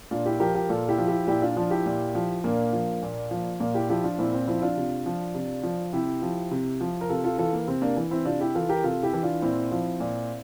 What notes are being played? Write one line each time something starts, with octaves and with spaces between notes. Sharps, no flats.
A#2 D4 F4
E4 G4
F3 G4 A#4
G4 A#4
A#2 F4 A4
E4 G4
F3
E4 G4
A#2 E4 G4
D4 F4
F3 D4 F4
E4 G4
A#2
F3
A#2 A#3 D4
F3
A#2
F3
A#2 A#3
E4 G4
F3 E4 G4
D4 F4
A#2 C4 E4
C4
F3 C4 E4
E4
D4 F4
C3
F3
C3
F3
C3 E4 G4
F3
C3
F3
A#4
C3 F4 A4
F4 A4
E3 F4 A4
A#3
C3 C4
A#3 D4
E3
C4 E4
C3 D4 F4
E4 G4
E3 F4 A4
G4 A#4
C3 F4 A4
E4 G4
E3
D4 F4
A#2 C4 E4
F3
A#2